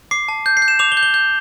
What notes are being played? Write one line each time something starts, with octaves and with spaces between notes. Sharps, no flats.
D6 C7
A5
G6
C7
G6
E7
D6 F7
G7
G6
G7
G6